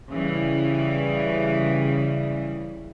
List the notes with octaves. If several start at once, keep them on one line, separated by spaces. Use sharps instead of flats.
C#3 E3 G3